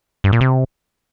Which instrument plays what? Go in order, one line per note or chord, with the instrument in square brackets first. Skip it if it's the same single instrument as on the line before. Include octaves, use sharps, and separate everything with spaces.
[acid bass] G2
A#2
C3